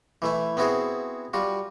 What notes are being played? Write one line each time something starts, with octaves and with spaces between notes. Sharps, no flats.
E3 A3 E4
B3 C4 E4 F#4 G#4 C5
G3 F4 F#4